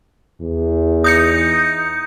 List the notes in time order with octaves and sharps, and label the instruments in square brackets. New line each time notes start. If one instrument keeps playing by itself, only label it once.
[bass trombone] E2
[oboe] D#4 [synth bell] D#6 G6 C#7